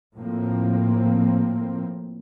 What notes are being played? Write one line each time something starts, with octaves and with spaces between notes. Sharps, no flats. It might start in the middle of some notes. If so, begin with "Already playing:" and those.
A2 F3 A#3 C4